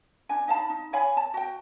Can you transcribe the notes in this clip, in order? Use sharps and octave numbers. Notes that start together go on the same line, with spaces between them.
D4 G#5
D#4 F5 A5 B5
D#4
C#5 F5 G#5 B5
A5
F#4 G5